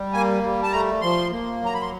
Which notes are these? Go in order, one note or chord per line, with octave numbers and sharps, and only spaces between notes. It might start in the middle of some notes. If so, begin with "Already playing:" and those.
Already playing: G3
A#3 G#5
G3
A5
A3 A#5
F3 C6
A#3
F#3 A#5
B5
C6